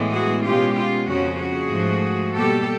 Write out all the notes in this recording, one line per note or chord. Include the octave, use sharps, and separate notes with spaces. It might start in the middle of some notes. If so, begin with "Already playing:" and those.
Already playing: A2 E3 G#3 B3
F#4 G#4
B2 G#3 C#4 F4 G4
F4
F2 C#3 F3 A#3 C#4 F#4
F#4 G#4
G#2 F3 A3
B2 G3 A#3 G4 A4